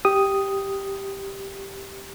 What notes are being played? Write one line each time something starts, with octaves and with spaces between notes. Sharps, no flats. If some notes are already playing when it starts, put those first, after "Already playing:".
G4 D#6